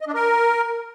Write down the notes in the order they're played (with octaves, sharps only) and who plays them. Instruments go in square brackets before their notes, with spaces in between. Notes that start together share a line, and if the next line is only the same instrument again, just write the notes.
[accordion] D#5
D4
A#4